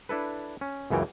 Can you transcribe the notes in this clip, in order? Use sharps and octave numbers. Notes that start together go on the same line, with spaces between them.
D4 E4 A4 B4
C#4
C#2 F#2 C#3 E3 C#5 G5